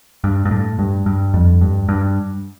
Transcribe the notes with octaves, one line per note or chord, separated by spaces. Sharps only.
G2
G2
A2
G2
G2
F2
G2
G2